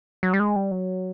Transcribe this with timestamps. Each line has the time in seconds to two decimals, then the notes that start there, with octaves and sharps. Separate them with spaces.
0.23 F#3
0.33 G3
0.40 G#3
0.56 G3
0.71 F#3